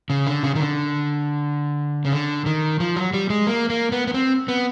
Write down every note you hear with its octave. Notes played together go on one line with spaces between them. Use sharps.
C#3
D3
C#3
D#3
D3
C#3
D3
D#3
F3
F#3
G3
G#3
A#3
A#3
B3
B3
C4
B3